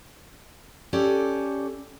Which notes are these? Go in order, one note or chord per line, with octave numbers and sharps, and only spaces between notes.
C#4 G4 A4 D5